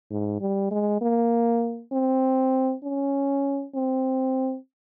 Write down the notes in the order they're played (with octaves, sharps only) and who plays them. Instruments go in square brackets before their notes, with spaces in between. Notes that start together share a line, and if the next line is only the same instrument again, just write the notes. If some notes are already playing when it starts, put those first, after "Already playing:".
[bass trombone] G#2
G3
G#3
A#3
C4
C#4
C4